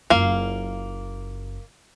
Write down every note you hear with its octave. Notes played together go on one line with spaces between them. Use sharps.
F#1 A#3 F4 F5